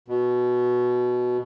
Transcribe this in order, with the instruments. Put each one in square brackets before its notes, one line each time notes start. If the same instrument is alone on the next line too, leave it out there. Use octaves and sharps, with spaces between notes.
[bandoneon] B2